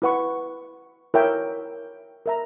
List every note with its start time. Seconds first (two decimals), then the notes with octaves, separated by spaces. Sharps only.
0.02 E4 B4 F#5 C#6
1.14 E4 A#4 C#5 E5 G5
2.26 A#4 E5 A#5